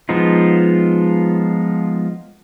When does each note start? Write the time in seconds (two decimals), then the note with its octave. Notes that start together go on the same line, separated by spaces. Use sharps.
0.09 F3 G#3 B3 D#4 F4